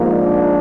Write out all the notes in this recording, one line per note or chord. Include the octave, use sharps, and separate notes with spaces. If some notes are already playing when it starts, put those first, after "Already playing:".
Already playing: G#2 F3 A#3
D4